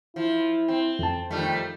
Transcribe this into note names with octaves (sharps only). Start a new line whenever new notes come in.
F3 E4
C4
F2 A5
D#3 F3 G3 A3